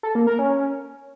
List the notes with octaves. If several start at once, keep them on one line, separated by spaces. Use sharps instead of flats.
A4
A#3
A#4
C#4